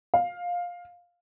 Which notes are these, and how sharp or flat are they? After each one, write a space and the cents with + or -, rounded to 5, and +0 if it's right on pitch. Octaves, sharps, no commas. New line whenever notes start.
F5 +15